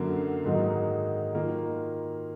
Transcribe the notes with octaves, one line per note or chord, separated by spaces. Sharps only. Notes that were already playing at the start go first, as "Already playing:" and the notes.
Already playing: F#2 D3 F#3 A#3
G#2 D#3 F#3 A#3 D#4
D#3 A#3 F4